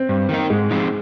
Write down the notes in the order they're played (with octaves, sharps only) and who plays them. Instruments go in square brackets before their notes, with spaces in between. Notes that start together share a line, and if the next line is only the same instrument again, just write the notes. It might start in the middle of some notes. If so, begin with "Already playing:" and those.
Already playing: [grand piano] C4
[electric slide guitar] G2
D#3 A#3 D#4
[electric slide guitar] G#2 [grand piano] G#3
[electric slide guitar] F3 C4 D#4